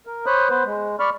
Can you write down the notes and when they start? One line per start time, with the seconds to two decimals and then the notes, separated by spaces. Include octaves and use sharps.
0.07 A#4
0.26 C5 C#5 B5 D#6 F#6
0.49 B3 B4 C5
0.65 G#3
1.00 D5 B5 C#6 F6